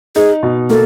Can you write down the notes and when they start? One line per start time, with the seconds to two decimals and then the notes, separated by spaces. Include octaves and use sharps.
0.16 D#4 G#4
0.43 B2
0.70 A#3 A4